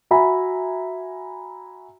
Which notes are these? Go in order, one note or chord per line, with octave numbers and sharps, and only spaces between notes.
F#4 E5 G#5 A#5 B5